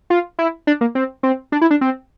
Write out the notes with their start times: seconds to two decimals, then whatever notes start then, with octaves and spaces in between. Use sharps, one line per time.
0.10 F4
0.39 E4
0.67 D4
0.81 A#3
0.95 C4
1.23 C4
1.52 D4
1.61 E4
1.71 D4
1.81 C4